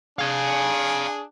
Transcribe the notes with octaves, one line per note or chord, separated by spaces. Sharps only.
D4 G#4 F5 G#5